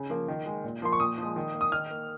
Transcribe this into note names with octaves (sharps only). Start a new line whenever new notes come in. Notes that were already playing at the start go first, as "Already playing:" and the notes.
Already playing: C#3
F3 A#3
D#3
G#3
A#2
F3 A#3 C6
C#6
A#2 D#6
F3 G#3
D#3
A#3
D#6
D#3 F6
A#3